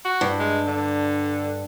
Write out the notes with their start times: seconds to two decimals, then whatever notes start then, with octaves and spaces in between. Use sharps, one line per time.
0.05 F#4
0.21 G2
0.39 G#3
0.67 D3